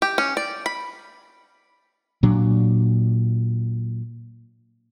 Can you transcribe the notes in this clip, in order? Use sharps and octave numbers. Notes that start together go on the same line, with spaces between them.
G4
C#4
D5
B5
A#2 F#3 D4